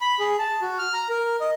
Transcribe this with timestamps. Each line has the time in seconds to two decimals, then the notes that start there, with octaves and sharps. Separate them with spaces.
0.01 B5
0.19 G#4
0.39 A5
0.62 F#4
0.79 F6
0.94 A#5
1.09 A#4
1.40 D#5